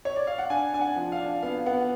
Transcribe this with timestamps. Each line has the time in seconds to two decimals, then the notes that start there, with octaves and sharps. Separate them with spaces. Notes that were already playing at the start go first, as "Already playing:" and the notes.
0.05 C#5
0.16 D5
0.27 F5
0.38 F#5
0.50 D4 G#5
0.73 D4 G#5
0.81 F#5
0.96 F3
1.12 F5
1.20 D4
1.43 B3 F5
1.66 B3 F#5